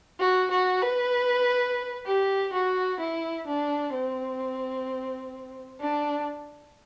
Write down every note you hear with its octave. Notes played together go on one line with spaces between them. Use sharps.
F#4
F#4
B4
G4
F#4
E4
D4
C4
D4